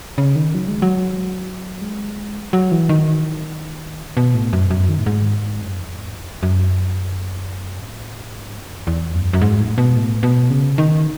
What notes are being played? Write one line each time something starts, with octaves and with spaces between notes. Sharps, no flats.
C#3
D#3
F#3
G#3
F#3
G#3
F#3
E3
D#3
B2
A2
F#2
F#2
D#3
A2
G#2
F#2
E2
G#2
E2
F#2
A2
G#2
F#2
E2
F#2
F#2
G#2
A2
B2
A2
B2
C#3
D#3